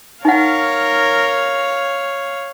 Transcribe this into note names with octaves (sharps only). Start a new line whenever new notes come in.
D#4 A#4 C#5 F5 F#5